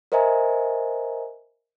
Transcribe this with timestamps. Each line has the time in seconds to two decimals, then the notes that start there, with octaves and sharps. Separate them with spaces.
0.12 A#4 C5 D#5 E5 G#5 A#5